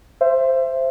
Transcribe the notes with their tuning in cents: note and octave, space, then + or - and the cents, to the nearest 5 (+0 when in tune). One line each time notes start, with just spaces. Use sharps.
C5 +0 E5 +30